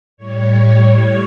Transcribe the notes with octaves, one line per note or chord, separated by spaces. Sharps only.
A2 G3 C#5